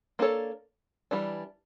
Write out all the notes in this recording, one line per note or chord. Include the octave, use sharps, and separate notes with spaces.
A#3 D4 A4 C#5
E3 G3 D4